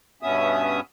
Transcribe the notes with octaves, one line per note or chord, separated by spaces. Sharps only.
G2 B2 B3 C#4 E5 D#6